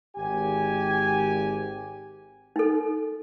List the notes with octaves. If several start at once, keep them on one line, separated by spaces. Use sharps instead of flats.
G#1 G4 G#5
D#4 A4